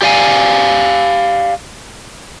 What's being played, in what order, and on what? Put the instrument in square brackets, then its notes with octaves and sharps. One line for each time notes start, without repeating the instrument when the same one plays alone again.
[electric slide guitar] G4 D5 F5 G#5